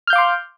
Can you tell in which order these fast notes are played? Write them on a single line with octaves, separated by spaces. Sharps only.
F6 G6 F5 D6 C6